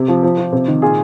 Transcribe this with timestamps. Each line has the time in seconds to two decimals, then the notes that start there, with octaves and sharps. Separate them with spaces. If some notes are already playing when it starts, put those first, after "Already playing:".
Already playing: C3 G4
0.08 F3
0.23 F3
0.38 F3
0.53 C3
0.68 D#3
0.82 A#2 F4 G#4